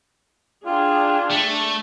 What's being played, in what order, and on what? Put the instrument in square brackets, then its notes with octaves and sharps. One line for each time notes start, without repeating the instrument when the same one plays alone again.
[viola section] D4 G#4 [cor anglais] F4 [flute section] G5
[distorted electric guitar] A3